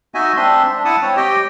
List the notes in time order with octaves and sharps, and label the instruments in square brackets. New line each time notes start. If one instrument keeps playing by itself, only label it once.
[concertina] D#4 F#4 D#5 E5 G#5
C4 D4 E5 C6
D4
E4 F#5 A5 D#6
C4 C#5
G4 D#5 G5